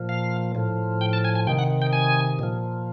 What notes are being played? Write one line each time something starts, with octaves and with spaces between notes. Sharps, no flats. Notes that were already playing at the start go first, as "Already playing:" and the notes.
Already playing: A#2 F3
F5
A2 F3
G5
A5
G#5
G#5
C3 D#3 G5
F#5
G5
G#5
A#2 F3